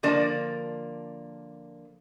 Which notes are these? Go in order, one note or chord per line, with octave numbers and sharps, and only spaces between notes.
D3 F3 A#3 D5 A5